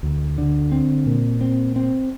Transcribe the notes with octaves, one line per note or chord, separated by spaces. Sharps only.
D2
D3
C4
A#2
C4
C4